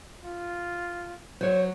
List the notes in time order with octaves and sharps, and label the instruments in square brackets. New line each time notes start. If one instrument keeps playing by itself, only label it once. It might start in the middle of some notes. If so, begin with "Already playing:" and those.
[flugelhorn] F4
[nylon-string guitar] F#3 [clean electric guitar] C5 C#5